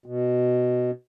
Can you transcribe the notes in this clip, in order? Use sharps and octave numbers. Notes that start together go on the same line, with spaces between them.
B2